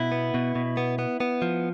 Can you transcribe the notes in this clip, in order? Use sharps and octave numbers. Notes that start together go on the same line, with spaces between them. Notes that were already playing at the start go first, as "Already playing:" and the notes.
Already playing: B2 E4
B3
B2
B2
B3
B3
B3
F3